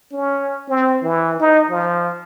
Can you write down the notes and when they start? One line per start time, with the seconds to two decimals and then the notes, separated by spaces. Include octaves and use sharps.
0.12 C#4
0.69 C4
1.03 E3
1.40 D#4
1.70 F3